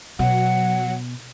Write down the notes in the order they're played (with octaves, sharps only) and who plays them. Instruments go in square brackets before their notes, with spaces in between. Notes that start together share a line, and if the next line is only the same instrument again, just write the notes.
[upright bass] B2 [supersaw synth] F#3 [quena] F#5